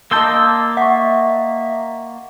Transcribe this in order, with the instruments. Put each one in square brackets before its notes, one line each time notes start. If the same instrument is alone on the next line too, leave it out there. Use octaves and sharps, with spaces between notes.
[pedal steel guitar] A#3 C6 G6 [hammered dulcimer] D#5 A5 D6 [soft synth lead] E6
[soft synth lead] E5 [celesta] F#5 C#6